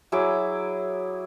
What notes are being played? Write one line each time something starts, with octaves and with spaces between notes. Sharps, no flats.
F#3 E4 G#4 D6